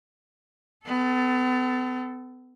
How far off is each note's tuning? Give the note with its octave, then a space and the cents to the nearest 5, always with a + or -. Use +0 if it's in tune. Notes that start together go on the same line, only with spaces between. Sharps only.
B3 +40 A4 +0